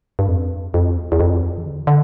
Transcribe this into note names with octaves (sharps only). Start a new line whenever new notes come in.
G2
F2
F2
E2
E2
F2
E3
D3
D3